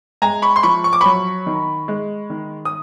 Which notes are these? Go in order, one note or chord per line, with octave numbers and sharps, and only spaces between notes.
G#3 G#5 A#5
B5 C#6
C6
F3 B5 C#6
C#6
D6
F#3 B5 C#6
D#3
G#3
D#3
D#6